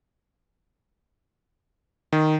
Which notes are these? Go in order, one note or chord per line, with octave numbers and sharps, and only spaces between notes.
D#3